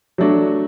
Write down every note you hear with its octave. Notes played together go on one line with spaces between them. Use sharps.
F#3 A3 D4 F#4